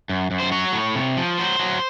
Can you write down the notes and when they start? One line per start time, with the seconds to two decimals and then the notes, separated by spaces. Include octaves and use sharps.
0.09 F#2
0.31 F#2
0.40 C5
0.52 F#3 C#5
0.73 A2
0.95 C3
1.17 F3
1.38 F#3 C5
1.59 F#3